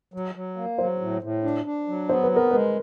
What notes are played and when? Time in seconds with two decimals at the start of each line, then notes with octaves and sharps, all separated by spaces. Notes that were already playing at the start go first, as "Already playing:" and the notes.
0.14 F#3
0.35 F#3
0.57 A#3
0.78 F#3 C5
1.01 A2
1.22 A2
1.44 D4
1.66 D4
1.88 F#3
2.09 B3 C5
2.23 B4
2.31 B3 A#4
2.51 G#3 B4